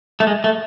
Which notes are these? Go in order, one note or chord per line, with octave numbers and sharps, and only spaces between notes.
A3
G#3
A3